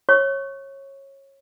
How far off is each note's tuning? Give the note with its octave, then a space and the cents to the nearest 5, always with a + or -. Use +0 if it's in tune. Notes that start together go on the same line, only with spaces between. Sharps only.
C#5 -20 C#6 +0